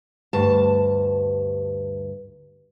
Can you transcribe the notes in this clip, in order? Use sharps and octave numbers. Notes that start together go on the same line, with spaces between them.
D2 G2 A5